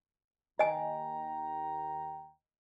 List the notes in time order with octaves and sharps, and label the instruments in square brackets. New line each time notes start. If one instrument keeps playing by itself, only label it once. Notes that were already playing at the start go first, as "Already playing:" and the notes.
[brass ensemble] D#2 G5 A#5 [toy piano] D#5 G#5